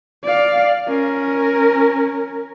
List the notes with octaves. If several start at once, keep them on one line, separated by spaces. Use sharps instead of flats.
D5 F5
C#4 A#4